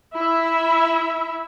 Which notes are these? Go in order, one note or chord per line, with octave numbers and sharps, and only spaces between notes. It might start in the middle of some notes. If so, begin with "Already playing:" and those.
E4 E5